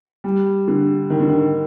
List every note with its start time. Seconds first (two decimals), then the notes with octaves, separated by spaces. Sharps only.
0.24 G3
0.68 D3
1.10 D#3
1.20 D3
1.29 D#3